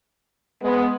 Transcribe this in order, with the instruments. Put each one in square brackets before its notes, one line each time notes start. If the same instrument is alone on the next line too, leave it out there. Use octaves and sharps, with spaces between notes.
[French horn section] G#3 B3